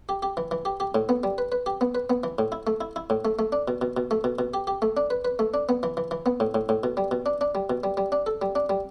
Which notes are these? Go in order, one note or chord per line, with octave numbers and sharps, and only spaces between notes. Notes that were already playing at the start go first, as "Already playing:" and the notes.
G4
G4
E3
E3
G4
G4
A2
B3
G3
B4
B4
G4
B3
B4
B3
E3
A2
E4
A3
E4
E4
A2
A3
A3
D4
B2
B2
B2
A3
B2
B2
G4
G4
A3
D4
B4
B4
A3
D4
B3
E3
E3
E3
B3
A2
A2
A2
B2
G3
B2
D4
D4
G3
B2
G3
G3
D4
A4
G3
D4
G3